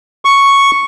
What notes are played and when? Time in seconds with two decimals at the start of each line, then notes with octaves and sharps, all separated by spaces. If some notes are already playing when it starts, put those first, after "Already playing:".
0.25 C#6